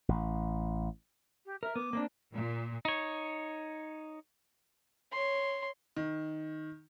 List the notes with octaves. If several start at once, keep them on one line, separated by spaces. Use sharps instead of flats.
A1
G4
A#4 E5
B3 D6
A#3 C4 D4
A#2
D#4 C#5
C#5 C6
D#3